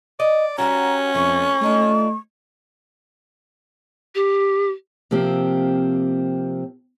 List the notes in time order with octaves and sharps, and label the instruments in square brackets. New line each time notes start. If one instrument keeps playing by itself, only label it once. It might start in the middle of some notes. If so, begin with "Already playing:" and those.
[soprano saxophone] D5 [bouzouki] D#5
[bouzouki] G3 F#4 [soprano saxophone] C#4 [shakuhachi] A#5
[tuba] F2 [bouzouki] F3 A3 [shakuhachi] C#6
[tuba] A3 [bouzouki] D4 D#4 F4
[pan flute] G4
[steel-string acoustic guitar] C3 F3 A#3 C4 G4